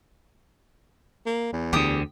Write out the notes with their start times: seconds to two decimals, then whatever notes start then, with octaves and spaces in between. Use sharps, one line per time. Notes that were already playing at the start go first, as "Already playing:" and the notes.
1.26 A#3
1.53 E2
1.73 D2 D3 G4 D#6